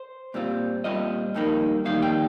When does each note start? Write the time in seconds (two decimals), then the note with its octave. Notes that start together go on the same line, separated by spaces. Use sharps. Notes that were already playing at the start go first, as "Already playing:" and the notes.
Already playing: C5
0.34 A#2 G3 C4 F4
0.84 A#2 G3 C4 F4 D#5
1.34 F2 D#3 G3 A#3 D#4
1.85 F2 D#3 G3 A#3 D#4 F5
2.02 G5